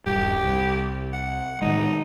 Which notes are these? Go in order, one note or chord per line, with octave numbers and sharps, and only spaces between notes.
D#1 G2 G4
C2
F#5
A2 D#3 G#3 D#4